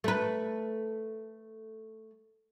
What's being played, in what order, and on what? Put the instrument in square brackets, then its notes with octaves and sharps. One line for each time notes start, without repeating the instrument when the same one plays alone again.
[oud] A3 B4